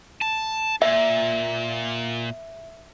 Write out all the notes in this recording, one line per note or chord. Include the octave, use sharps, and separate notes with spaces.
A5
A#2 E5